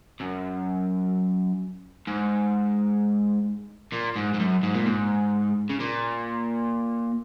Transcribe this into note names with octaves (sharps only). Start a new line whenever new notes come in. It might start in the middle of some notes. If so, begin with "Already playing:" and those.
F#2
G#2
A#2
G#2
G#2
F#2
G#2
A#2
G#2
C#3
A#2